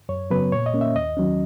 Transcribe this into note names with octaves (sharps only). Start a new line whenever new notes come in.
F#2 C#5
C#3 F#3 B3 B4
A#2 C#5
D#5
A#3 C#4
E5
D#2 D#5
D#3 F#3 C#4